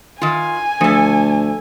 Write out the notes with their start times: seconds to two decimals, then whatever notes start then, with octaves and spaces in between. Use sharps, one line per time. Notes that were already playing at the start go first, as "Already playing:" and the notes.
0.22 D#3 F4 G#5
0.81 D2 F3 A4